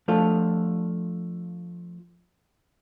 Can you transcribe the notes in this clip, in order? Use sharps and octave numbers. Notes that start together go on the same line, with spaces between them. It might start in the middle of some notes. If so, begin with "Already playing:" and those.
F3 A3 D4 F4 A4